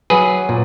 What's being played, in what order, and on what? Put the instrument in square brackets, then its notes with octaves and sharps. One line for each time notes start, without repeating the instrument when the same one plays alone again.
[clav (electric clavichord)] F#3 G#4 B4
A#2